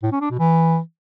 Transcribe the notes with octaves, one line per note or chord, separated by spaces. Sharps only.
A2
C#4
D4
B2
E3